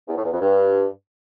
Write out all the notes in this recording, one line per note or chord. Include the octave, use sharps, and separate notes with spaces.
E2
A2
E2
F2
G2